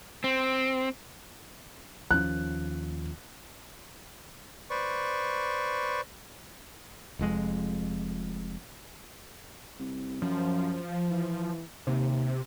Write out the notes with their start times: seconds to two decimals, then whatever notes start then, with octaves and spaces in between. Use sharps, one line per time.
0.24 C4
2.11 D#2 F3 C#4 F#6
4.70 B4 C5 D5 C#6
7.19 F1 F2 G#3
9.79 C2
10.22 F#2 F3
11.11 E3
11.87 D#2 C3